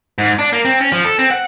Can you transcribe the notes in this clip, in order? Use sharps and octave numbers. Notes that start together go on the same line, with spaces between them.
G#2
D4
A#3
C4
C#4
F3
A4
C4
F#5